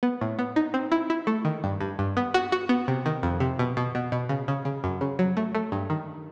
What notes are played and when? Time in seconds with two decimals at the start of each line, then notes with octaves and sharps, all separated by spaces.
0.03 B3
0.21 A2
0.39 B3
0.56 D#4
0.74 C4
0.92 E4
1.10 E4
1.27 A3
1.45 D#3
1.64 G2
1.81 G2
1.99 G2
2.17 B3
2.34 F#4
2.52 F#4
2.69 B3
2.88 C3
3.06 D#3
3.23 F2
3.40 C3
3.59 B2
3.77 B2
3.95 B2
4.12 B2
4.29 C#3
4.48 C#3
4.65 C#3
4.84 F#2
5.01 C#3
5.19 F#3
5.37 A3
5.55 A3
5.72 G2
5.90 D#3